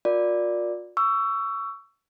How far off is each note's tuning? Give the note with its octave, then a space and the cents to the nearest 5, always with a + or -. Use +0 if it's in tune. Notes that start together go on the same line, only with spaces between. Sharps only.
F4 +40 A#4 +10 D5 +0
C#6 +20 E6 +20